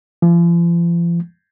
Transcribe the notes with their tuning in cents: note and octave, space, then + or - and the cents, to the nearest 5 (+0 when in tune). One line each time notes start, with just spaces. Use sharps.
F3 -40